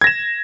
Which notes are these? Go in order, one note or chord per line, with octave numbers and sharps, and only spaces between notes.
G#6 A#6 E7